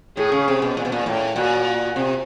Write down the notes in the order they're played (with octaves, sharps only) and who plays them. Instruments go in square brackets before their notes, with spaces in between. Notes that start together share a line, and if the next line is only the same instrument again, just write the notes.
[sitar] A2 [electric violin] G#4
[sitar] C#3
C3
B2
A#2
B2
A#2
A2
[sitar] A#2 [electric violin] F#4
[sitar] C3